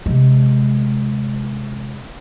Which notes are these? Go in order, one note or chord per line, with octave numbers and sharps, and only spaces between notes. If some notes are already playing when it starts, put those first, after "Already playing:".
C3 G#3